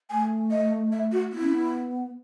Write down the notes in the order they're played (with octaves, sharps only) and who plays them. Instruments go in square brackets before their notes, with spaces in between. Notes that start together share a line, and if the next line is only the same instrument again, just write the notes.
[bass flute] A3 [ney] G#5
[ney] D#5
E5
F#4
[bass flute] B3 [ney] E4
[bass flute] C#4
B3